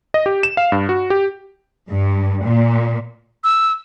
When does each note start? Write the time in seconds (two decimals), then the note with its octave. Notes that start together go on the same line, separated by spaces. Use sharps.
0.14 D#5
0.26 G4
0.43 E7
0.57 F5
0.72 G2
0.89 F#4
1.10 G4
1.89 G2
2.46 A#2
3.44 E6